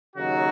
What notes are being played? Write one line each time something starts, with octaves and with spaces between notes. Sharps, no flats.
D#2 C#3 F#3 D#4 F#4